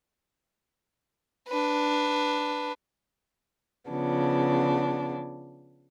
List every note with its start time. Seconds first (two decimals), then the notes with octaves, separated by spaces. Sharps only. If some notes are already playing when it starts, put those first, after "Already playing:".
1.48 D4 B4
3.90 C#3 F3 B3 D4